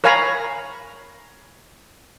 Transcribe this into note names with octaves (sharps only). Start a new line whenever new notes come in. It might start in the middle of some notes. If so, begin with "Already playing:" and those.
A#4 C#5 F5 G#5 A#5 B5